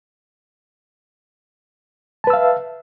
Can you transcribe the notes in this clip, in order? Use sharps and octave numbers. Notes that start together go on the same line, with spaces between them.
B4 E5 F5 A5 E6